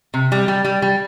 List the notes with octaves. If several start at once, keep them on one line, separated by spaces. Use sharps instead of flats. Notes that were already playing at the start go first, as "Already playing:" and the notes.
C3
G3
G3
G3
G3